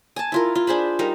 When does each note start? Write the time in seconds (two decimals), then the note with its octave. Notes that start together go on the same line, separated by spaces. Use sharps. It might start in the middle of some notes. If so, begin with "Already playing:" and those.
0.16 G#5 A5
0.32 E4 F4 A#4
0.55 F4
0.67 D4 G#4 C5 B5
0.99 G3 D#4 A#4 F5